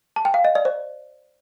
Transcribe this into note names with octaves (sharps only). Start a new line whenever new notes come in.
A5
G5
F5
D#5
D5
C5